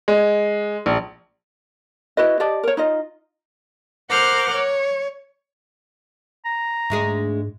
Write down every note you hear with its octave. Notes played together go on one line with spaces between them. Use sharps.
G#3
A#1
E4 F#4 B4 D#5
G4 D5 D#5 A5
A#4 C#5
D#4 F4 D#5
A#4 C5 F#5 D6 F6 G6
C#5
A#5
D2 G#2 G#3 G#4